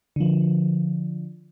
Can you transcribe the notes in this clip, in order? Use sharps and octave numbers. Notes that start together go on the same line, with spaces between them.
D3 F3